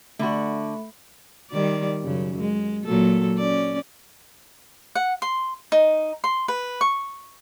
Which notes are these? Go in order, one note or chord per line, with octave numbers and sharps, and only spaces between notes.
D3 A3 F#4 B5
D#3 G3 D5
F#2 C#3
G#3
A#2 F#3 A4
C#4 D5
F#5
C6
D#4
C6
B4
C#6